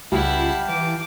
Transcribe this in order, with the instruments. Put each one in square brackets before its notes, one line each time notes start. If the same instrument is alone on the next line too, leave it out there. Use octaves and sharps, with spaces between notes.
[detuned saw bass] C#2 [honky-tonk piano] G3 [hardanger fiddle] E4 F#5 [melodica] G4 F5 A5
[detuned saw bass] E3 [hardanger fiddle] D6